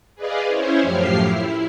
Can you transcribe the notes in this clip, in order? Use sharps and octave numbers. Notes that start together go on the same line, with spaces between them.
G#4 B4 D5 D#5 F5
C#4 E4 C5 C#5
F#2 A2 F3 G4 F6 C7
E4